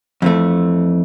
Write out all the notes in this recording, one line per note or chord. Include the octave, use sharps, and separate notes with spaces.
F2 E3 A3